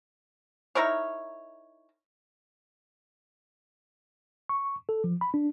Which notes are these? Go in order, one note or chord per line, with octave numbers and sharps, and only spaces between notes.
D#4 E4 A#4 C#5
C#6
A4
F3
B5
D4